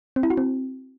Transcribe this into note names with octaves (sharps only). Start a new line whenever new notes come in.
C4
E4
F#4
C4